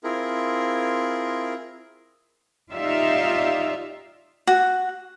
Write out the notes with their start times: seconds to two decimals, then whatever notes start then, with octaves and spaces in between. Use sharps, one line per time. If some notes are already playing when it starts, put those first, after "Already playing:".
0.04 C4 E4 F4 G#4 A#4
2.72 D#4 F4 G4 D5 E5 F5
4.47 F#4